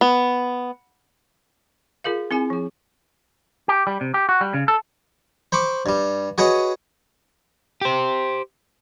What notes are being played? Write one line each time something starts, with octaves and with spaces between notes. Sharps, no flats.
B3
F4 G#4 A#4 F5
C4 E4 G#4 G#5
F3 G#4
G4
G3
C3
G4
F#4
G3
C#3
A4
C5 B5 C#6 D6
G2 G3
F#4 G#4 B4 C#5 D#5
G4 C5